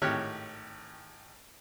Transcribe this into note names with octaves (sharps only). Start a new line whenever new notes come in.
G#1 A2 G4 C#5 F6 F#6